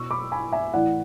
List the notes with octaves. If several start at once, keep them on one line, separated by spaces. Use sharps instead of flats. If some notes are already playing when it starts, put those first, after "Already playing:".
Already playing: B2 C#6 E6
B5 D6
G#5 B5
E5 G#5
A2 E3 D5 F#5